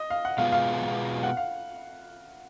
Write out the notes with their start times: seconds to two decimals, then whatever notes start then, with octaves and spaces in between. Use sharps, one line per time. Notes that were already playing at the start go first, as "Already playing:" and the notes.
Already playing: D#5
0.10 F5
0.25 F#5
0.38 B2 G#3 B3 F4 F5
0.52 F5
1.23 F#5
1.37 F5